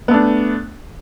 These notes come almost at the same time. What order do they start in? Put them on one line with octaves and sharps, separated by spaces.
B3 A3 D4